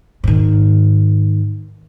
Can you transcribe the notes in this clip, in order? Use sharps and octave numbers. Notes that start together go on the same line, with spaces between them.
G#2 D#3